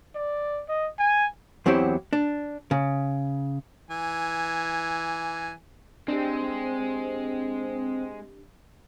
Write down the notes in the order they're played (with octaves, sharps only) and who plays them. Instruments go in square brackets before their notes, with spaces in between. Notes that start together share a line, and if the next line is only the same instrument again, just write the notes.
[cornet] D5
D#5
G#5
[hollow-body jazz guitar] E2 F#3 C4 E4 G4
D4
C#3
[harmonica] E3 G#5
[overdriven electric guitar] G#3 [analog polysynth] C4 [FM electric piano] D4 G4